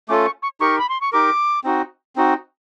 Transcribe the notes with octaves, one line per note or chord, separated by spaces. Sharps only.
A3 C#4 F4 A4 D6
C#6
C#6
D#4 G4 A#4 C#6
B5
C6
C#6
D#4 G4 A#4 D6
C4 D#4 F#4
C4 D#4 F#4